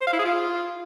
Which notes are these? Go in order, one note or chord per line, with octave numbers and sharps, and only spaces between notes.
C5
F5
E4
G#4
F4